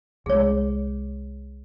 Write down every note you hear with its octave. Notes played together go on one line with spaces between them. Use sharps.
C2 G#3 G#4 C#5